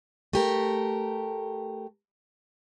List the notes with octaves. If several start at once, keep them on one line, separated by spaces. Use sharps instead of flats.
A3 G4 A#4